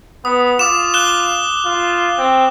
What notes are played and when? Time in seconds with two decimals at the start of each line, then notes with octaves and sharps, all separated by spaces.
0.25 B3 D#6
0.59 F4 D6 E7
0.94 F#6 E7 G7
1.65 F4
2.18 C4